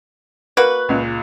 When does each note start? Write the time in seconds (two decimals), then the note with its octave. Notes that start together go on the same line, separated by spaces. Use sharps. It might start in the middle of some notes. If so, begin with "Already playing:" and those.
0.57 A#3 F#4 B4 F#6
0.89 C#2 A#2